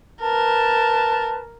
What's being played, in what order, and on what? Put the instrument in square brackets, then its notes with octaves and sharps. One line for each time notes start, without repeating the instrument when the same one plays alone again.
[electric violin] A#4 [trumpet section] B4 A5